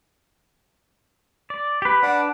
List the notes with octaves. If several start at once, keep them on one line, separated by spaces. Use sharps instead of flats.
D5
G4 B4
D4 B4 D5 F#5